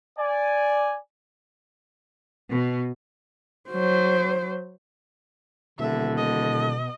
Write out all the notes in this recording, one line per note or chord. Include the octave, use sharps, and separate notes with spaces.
D5 G#5
B2
F#3 C5
D#1 B2 D3 E5
D#5